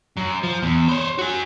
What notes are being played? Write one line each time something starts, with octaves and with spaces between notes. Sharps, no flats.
F#2
F3
E2
C5 C#5
F#4 G#5